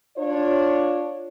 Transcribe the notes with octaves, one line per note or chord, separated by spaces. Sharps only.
D4 F4 C#5